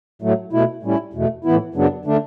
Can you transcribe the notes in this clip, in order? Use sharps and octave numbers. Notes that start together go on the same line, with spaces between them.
A2 F#3 A3
B2 A3 E4
A2 G3 C#4 E4
E2 B2 A3
A2 E3 B3 E4
F#2 C#3 F#3 B3 D4
D3 A3 D4